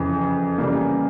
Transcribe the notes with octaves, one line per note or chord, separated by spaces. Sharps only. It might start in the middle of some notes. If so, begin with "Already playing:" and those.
Already playing: F2 C#3 E3
C#3 E3 G3 A#3